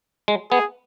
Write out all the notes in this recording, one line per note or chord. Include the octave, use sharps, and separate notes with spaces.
G#3
B3 G#4